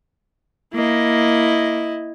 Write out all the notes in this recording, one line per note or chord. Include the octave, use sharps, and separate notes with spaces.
A#3 E4 D#5